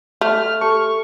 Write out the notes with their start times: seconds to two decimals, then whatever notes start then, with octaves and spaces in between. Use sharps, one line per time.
0.21 A3 F6
0.61 G4 A4 A5 C#6